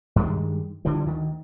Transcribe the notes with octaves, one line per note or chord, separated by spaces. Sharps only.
G2 D#3 G3 G#3
D3 E3 F3 G3
D2 D#3